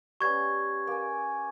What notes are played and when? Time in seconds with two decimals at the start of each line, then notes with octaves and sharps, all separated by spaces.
0.21 G3 B3 C#4 C#6 G#6
0.87 A#3 G#5